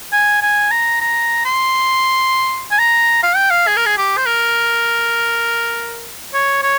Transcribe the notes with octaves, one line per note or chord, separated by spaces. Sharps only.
G#5
G#5
A#5
A#5
C6
G#5
A#5
F5
G5
F5
G#4
A#4
G#4
G4
C5
A#4
C#5
C#5